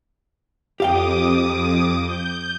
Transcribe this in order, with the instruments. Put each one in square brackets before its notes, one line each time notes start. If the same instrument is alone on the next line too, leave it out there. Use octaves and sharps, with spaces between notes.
[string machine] F2 D6 D#6 [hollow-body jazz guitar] G4 F5 G5
[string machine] G6